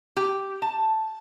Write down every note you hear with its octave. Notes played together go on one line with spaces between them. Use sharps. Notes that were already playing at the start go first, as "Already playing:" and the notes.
G4
A5